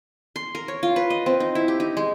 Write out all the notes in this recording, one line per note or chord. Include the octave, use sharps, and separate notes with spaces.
C6
A#4
C#5
F4
B4
D#5
C4
D#4
E4
G4
D#4
G#3